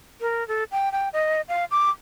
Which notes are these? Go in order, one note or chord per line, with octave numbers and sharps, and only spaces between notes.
A#4
A4
G5
G5
D#5
F5
D6